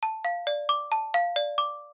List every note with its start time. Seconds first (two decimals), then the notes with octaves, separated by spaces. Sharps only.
0.03 A5
0.25 F5
0.47 D5
0.69 D6
0.92 A5
1.14 F5
1.36 D5
1.58 D6